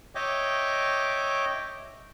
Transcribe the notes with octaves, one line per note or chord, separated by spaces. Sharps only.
C#5 D#5 E5 G5 D6